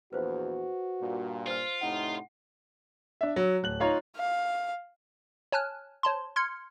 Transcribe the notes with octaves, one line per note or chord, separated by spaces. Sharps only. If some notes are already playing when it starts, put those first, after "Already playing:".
A#1 E2 F#4 B4 C5
G2 A#2
F4 C5 F6
A2 C3 D#4 F#5
D4 E5
F#3
D1 F#6 F#7
D#4 F4 C#5 F5 A#5
F5
C#5 G#5 A5 F6 F#6
C5 C#5 A5 C6
C6 F6 G#6 C#7